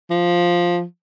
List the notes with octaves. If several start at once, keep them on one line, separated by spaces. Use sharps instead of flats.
F3